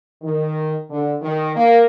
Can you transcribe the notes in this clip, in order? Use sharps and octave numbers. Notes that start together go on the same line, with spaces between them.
D#3
D3
D#3
A#3